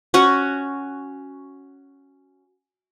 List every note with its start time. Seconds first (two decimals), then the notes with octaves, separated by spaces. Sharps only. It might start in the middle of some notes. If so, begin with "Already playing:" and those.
0.14 C#4 F#4 F#5